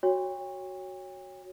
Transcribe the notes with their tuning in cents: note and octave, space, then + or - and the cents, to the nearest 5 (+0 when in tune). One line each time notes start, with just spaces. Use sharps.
F#4 +5 C#5 -5 G5 +45